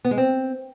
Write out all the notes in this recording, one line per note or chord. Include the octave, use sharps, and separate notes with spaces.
B3
G#3
C4